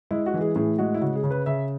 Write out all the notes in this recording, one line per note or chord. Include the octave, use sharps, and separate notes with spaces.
G#3 E4
F#4
E3
G#4
A2 G#4
G#3 F#4
E4
C#3 F#4
G#4
C#3
B4
C#3 E5